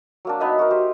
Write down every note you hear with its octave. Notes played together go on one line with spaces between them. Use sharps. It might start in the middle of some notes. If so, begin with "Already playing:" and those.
F#3 A#3 D4
B3 D#4 D#5 E5
F#4 A#4
G4 C5